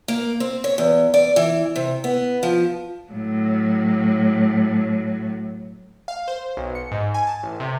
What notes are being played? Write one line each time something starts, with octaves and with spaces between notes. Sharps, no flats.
A#3
C4
C#5
E2
D5
E3
C3
B3
F3
A2 F#3
F5
C5
B1
C#7
G#2
G#5
A5
A1
C3